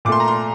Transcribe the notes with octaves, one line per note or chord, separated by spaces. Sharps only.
A#2 A3 C6 D6
A#5
C6